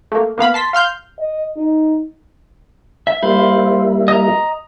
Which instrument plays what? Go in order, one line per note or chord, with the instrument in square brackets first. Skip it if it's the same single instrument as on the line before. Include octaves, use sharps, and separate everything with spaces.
[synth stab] A3 A#3
A#3 B3 F5 B5
A5 C6 B6
F5 C6 F6 G6
[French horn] D#5
D#4
[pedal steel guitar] E5
[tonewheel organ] G3 A#3 E4 [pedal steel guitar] C5 F5 B5
[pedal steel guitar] D#5 A#5